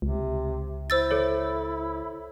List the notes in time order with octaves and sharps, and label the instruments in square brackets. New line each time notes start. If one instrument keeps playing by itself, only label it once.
[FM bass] C#2 [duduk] C3
[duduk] E4 [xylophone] C5 E6 A6
[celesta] A4 C#5